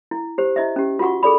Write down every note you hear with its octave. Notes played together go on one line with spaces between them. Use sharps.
E4
G4 C5
E4 D#5 E5
C#4 G4
F4 F#4 F#5 C#6
G#4 A4 D5 B5